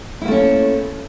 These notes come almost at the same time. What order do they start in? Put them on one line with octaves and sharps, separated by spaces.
E4 A#3 A3 C#4